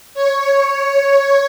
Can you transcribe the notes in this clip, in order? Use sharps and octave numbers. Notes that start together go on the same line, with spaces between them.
C#5